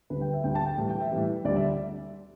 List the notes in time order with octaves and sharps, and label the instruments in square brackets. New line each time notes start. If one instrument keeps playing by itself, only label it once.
[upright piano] D2 D3 G3 B4
G5
E5
D2 D3 G3 G5
A5
G5
A2 E3 G3
G5
E5
A2 E3 G3
D2 D3 G3 D5
E5